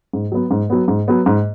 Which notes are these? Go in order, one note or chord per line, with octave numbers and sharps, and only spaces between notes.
G#2
F#3 B3
G#2
F#3 B3
G#2
F#3 B3
G#2